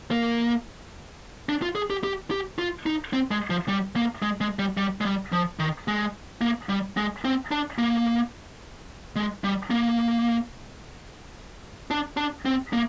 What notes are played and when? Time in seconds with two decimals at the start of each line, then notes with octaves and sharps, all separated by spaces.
0.11 A#3
1.49 D4
1.62 F4
1.75 G#4
1.90 G4
2.03 G4
2.31 G4
2.59 F4
2.86 D#4
3.13 C4
3.31 G#3
3.50 F3
3.68 G3
3.96 A#3
4.22 G#3
4.41 G#3
4.59 G3
4.77 G3
5.01 G#3
5.05 G3
5.32 F3
5.59 D#3
5.88 G#3
6.41 A#3
6.69 G3
6.97 G#3
7.25 C4
7.51 D4
7.78 A#3
9.16 G#3
9.44 G3
9.70 A#3
11.91 D4
12.17 D4
12.45 C4
12.73 A#3